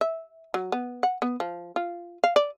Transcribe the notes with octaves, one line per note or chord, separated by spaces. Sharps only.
E5
F#3
B3
F#5
B3
F3
F4
F5
D5